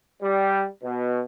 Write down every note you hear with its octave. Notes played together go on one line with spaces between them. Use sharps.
G3
B2